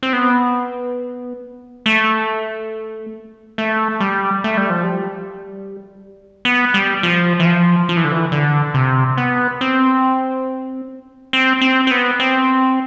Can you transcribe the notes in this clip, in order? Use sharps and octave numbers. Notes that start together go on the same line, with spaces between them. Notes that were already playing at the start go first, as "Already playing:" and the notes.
C4
B3
A3
A3
G3
A3
G3
F3
G3
B3
G3
F3
E3
F3
F3
E3
D3
E3
D3
C3
B3
C4
C4
C4
C4
B3
C4